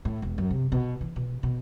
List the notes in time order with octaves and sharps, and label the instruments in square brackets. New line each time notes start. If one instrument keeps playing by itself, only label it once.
[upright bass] A2
E1
F#2
C3
B2
E3
B2
B2